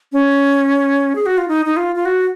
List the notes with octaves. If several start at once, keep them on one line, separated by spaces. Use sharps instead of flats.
C#4
G#4
F#4
F4
D#4
D#4
F4
F4
F#4